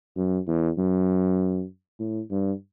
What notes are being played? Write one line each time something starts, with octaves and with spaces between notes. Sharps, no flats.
F#2
E2
F#2
A2
G2